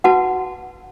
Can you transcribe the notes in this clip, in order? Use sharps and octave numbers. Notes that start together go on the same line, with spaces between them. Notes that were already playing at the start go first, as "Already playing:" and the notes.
F#4 B4 F#5 A5